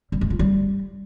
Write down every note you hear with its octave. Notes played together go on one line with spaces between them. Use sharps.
G3
G#3
F4
G3